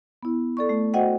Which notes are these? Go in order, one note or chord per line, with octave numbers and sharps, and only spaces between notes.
B3 E4
A4 D5 C#6
A3
F#4 C5 D#5 F#5 G5